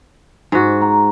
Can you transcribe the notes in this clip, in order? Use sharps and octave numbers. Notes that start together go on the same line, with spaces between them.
G#2 F#4
A#5